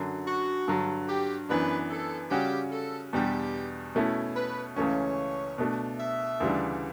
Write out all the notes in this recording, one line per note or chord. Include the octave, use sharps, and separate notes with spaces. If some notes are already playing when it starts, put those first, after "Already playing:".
Already playing: F#2 D3 F#3
F#4
G2 D3 F#3
G4
F#2 E3 B3 D4 B4
A4
C#3 G3 C#4 F#4 G4
A4
E2 B2 G3 D4 G4
B2 A3 C#4 E4
B4
C#2 C#3 E3 A3 C#4 C#5
B2 A3 D4
E5
D2 C#3 E3 G3 D4